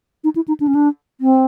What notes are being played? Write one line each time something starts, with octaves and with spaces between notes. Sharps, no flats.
D#4
E4
D#4
D4
C#4
D4
C4